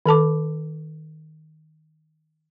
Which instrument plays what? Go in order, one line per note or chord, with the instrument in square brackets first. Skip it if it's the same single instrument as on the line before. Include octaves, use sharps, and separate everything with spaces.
[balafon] D#3 A4 A5 D6